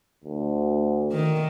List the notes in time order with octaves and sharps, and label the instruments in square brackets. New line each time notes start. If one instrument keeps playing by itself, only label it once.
[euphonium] D2
[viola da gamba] D#3